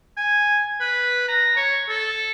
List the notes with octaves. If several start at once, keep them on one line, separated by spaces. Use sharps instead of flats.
G#5
B4
A#5
C#5
A4